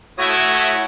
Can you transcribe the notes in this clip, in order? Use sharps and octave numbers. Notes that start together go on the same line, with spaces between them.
A3 E4 F#4 C#5 D#6